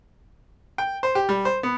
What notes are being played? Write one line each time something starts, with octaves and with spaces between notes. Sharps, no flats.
G5
C5
G4
G3
C5
B3